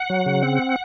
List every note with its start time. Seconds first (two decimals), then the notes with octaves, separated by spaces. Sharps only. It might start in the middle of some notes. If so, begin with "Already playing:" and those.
Already playing: F#5
0.10 F#3
0.26 C#3
0.43 C4